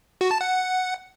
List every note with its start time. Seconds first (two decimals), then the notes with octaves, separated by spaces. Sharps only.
0.21 F#4
0.31 A5
0.41 F#5